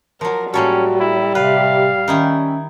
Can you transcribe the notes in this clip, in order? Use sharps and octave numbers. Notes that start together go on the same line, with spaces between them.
F3 F#3 A#4
A2 G3 A#3 C#4 F#4 A4
E4
C3 B4 F5
D#3 C#4 D#4 E4